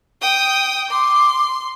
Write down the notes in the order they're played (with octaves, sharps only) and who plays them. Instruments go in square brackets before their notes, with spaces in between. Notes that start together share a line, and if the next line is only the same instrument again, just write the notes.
[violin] G5 D#6
[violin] C6 [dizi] D6